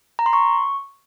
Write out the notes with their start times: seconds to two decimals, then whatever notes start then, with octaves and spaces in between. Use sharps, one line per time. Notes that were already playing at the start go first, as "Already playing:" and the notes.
0.19 A#5
0.26 C6
0.33 C#6